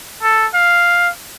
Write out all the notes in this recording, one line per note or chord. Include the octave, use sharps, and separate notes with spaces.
A4
F5